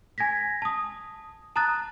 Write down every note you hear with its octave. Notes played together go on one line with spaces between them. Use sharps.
G#5 G#6 A#6 B6
A5 D#6
A5 A#5 D#6 F#6 A6